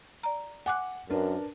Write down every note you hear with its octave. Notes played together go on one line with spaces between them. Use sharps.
D5 A#5
F#5 G#5 D6 F#6
F#2 D4 A#4 B4